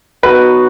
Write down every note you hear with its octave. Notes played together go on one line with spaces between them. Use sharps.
F#3 B3 D#4 F#4 B4